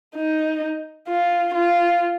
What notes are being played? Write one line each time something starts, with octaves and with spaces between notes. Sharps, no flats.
D#4
F4
F4